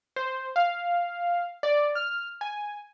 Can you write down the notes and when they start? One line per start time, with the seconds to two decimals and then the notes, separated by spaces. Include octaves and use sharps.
0.16 C5
0.56 F5
1.63 D5
1.95 F6
2.41 G#5